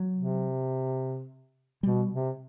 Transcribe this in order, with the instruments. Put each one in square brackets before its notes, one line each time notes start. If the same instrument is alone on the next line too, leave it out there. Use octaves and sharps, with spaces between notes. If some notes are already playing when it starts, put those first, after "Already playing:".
Already playing: [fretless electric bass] F#3
[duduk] C3
[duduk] B2 [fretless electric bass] G3
[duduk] C3